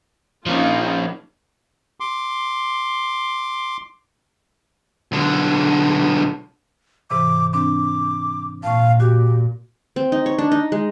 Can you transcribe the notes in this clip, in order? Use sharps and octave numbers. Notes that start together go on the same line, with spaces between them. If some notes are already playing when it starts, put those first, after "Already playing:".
F3 A#3 C#4 D#4 F4
C6 D6
B1 D3
G#2 C3 E3 D6
C4 D4 D6
A#2 F5 A5 C#6
F#4 G4
C4
D#4
C#5
D4
D#4
G#3